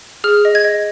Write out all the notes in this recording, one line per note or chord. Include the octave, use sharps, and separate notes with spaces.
G#4 F6
D#5
G#6
D#5